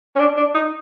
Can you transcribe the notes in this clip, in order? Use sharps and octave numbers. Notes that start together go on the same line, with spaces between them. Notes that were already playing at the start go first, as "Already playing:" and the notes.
C#4
D4
D4
D#4